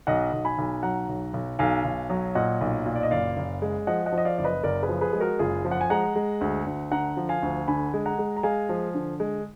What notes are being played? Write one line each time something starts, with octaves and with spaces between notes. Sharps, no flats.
B1 D#5 F#5
B1
G#5 B5
B1
F#3 F#5 A#5
B1
B1
B1 F5 G#5
B1
F#3
A#2 D#5 F#5
B1
A#2
D5
D#5
F#1 D5 F5
F#1
G#3
F3 D#5 F#5
D#5 F#5
F3
D#5
D5 F5
F#1 D5
B4 D#5
F#1 A#4 D5
G#4 B4
F3
G#4 B4
G#3 G#4
F#4 A#4
F#1 F4 G#4
F3
F#5
G#5
G#3 F#5 A#5
G#3
D2
D2
D3 F#5 A#5
F3
F5 G#5
D2
D3 G#5 B5
G#3
F#5 A#5
G#3
A#5
G#3 F5 G#5
F3
D3
G#3